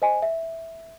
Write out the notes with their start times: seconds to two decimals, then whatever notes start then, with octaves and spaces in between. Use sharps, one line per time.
0.02 C5 D#5 G#5
0.22 E5